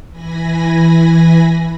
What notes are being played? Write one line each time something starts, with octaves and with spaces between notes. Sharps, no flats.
E3 G#5 B5 A#6